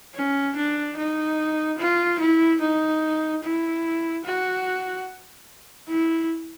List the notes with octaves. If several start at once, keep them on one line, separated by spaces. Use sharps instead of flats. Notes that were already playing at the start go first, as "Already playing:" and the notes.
C#4
D4
D#4
F4
E4
D#4
E4
F#4
E4